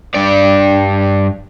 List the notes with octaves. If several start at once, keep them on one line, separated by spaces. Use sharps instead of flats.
G2 D5